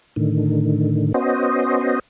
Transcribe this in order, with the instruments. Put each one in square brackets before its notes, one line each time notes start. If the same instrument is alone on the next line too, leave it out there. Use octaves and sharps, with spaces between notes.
[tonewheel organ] A2 D3 D#3
B3 C#4 F#4 C5 D#5